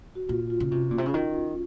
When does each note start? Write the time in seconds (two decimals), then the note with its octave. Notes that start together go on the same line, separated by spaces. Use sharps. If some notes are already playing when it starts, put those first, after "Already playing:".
0.15 F#4
0.29 A#2 F4
0.50 F4
0.60 C#3
0.71 C3 C#4
0.91 A#2
0.98 C3
1.06 C#3
1.14 D#3